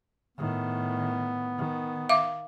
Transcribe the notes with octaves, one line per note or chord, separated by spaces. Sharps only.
A2 D#3 B3
D#3
E5 F5 D6